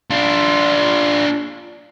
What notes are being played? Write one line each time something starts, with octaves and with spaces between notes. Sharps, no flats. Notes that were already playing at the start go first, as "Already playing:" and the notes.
D4 F4